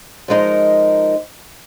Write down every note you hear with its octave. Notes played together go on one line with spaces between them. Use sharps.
F3 G#3 D#4 A#4